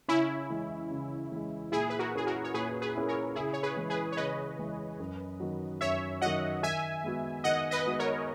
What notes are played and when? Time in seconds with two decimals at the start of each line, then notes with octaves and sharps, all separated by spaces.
0.08 C#3 C#4 E4
0.50 E3 G#3
0.91 C#3
1.32 E3 G#3
1.72 A#2 E4 G#4
1.90 B4
1.99 F#4 A#4
2.13 A#3 C#4 E4 G#4
2.27 F#4 A#4
2.44 C#5
2.54 A#2 G#4 B4
2.82 G#4 B4
2.95 A#3 C#4 E4
3.08 A#4 C#5
3.35 C#3 E4 G#4
3.53 C#5
3.63 G#4 B4
3.77 E3 G#3
3.90 G#4 B4
4.12 C#5
4.17 C#3 B4 D#5
4.59 E3 G#3
5.00 F#2
5.40 D#3 F#3
5.81 F#2 C#5 E5
6.21 D#3 F#3 D#5 F#5
6.63 D#3 E5 G#5
7.03 G#3 B3 F#4
7.44 D#3 D#5 F#5
7.71 B4 D#5
7.85 G#3 B3 F#4
7.99 A#4 C#5